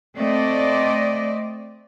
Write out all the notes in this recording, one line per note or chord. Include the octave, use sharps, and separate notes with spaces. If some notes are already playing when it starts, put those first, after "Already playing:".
A3 C4 D5 D#5